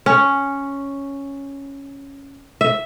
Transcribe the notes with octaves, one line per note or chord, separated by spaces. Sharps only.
C#4
E5